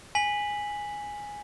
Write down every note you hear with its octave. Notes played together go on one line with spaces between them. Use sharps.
G#5 B6 F#7